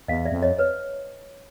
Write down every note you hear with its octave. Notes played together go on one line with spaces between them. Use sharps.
E2 D#5 F5
D5 E5
F2
C#5 D#5
B4 C#5